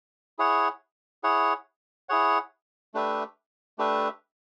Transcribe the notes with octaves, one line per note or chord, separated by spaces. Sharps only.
E4 G#4 C#5 F#5
E4 G#4 C#5 F#5
E4 G#4 C#5 F#5
A3 D4 G4 B4 E5
A3 D4 G4 B4 E5